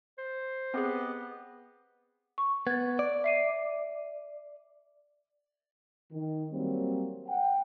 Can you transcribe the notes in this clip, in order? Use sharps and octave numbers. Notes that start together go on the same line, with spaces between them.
C5
B3 C4 G4 G#4 D#5
C#6
B3 G#6 A6
D5
E5 C7 D#7
D#3
F#3 G3 A#3 C4
F#5 G5